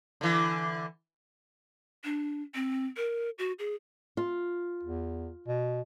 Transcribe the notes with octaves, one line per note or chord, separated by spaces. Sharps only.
D3 E3
D4
C4
A#4
F#4
G#4
F4
E2
B2